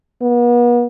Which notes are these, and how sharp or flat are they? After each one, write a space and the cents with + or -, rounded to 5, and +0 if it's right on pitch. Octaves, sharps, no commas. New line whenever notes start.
B3 -40